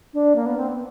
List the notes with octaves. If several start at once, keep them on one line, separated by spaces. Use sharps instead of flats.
D4
A#3
B3
C4
B3